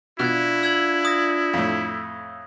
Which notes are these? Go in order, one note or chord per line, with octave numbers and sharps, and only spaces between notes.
B2 D4 E4 F4 F#6 G#6
E6 G#6 F#7
D#6 A#6
F2 A2